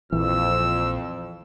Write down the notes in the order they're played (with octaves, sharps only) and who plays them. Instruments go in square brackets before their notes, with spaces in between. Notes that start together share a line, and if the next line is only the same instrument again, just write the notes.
[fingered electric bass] A#1 [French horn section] F2 [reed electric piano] E3 [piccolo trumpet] E6